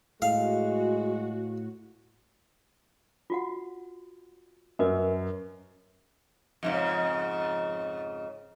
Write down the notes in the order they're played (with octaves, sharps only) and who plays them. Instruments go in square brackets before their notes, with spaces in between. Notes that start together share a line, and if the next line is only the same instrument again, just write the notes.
[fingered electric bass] A2 [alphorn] G#3 [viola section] F#4 [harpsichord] F5
[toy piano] F4 F#4 F#5
[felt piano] F#2 [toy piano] A#4 B4 D#5
[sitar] F2 G#2 C#3